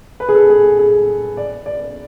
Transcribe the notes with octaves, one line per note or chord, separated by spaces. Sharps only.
B4
G#4
A4
G#4
G#4
D5
D5